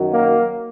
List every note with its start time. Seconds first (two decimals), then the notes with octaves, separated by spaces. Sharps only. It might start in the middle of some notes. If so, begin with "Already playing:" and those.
Already playing: F#2 D#3 F#3
0.12 A#3